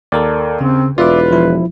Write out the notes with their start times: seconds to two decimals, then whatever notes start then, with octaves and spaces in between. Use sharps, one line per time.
0.12 D#2 A4 A#4 D5
0.61 C#3 C4
0.98 E1 F4 B4 D5 E5 D6
1.32 F3 E4